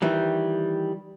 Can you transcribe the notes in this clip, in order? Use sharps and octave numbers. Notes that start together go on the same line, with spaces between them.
D#3 E3 G3